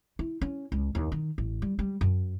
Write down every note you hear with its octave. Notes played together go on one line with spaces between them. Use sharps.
E4
C#4
C#2
D#2
D#3
A1
G3
G3
F#2